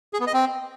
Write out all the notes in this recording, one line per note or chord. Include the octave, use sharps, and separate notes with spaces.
G#4
B3
D#5
C4